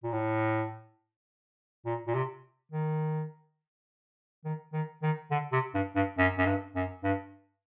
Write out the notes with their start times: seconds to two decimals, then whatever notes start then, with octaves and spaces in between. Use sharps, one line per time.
0.04 A#2
0.12 A2
1.86 A#2
2.07 A#2
2.15 C3
2.72 D#3
4.45 D#3
4.73 D#3
5.03 D#3
5.31 D3
5.52 C3
5.75 G2
5.96 G2
6.18 F#2
6.38 F#2
6.46 G2
6.76 F#2
7.04 G2